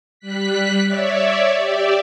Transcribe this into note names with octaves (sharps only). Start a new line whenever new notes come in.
G3 F#6 B6
C#5 D5 E5
G4 D5 E5